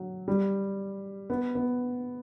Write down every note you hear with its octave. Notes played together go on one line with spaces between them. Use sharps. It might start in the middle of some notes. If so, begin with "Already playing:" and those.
Already playing: F#3
G3
B3
B3